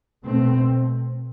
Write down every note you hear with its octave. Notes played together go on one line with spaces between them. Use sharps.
B2 A3 C4